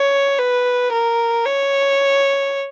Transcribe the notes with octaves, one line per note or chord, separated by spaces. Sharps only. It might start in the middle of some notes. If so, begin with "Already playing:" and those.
Already playing: C#5
B4
A#4
C#5